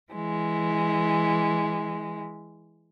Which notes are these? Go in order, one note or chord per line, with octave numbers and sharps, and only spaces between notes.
E3 G#3